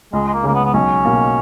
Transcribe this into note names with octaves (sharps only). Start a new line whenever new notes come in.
C#2 G#3
G#3
A#3
C#3 G#3 A#3
B3
B3
B1 C#4
B2 A#3